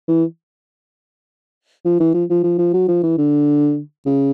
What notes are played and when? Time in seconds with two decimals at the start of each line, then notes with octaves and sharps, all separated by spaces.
0.08 E3
1.85 F3
2.00 E3
2.14 F3
2.30 F3
2.43 F3
2.58 F3
2.73 F#3
2.88 F3
3.03 E3
3.18 D3
4.06 C#3